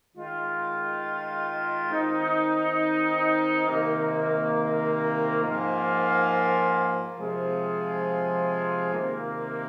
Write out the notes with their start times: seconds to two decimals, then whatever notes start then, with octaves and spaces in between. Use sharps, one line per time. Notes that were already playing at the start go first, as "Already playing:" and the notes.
0.15 D#3 G#3 F4
1.91 D#3 C4 D#4
3.66 C3 D#3 A#3
5.42 G#2 F3 A#3 F4
7.18 C3 F3 G#3 F4 G#4
8.93 C3 D#3 A#3